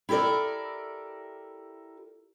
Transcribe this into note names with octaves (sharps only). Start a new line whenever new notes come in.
E4 G4 A4 A#4 D5